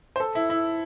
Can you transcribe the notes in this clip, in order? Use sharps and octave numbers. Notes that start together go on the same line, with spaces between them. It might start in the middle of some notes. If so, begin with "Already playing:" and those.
C5
A4
E4
E4